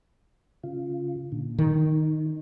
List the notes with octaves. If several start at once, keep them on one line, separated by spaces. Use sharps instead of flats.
C#3 F4
A#2 D3
D#3 D#4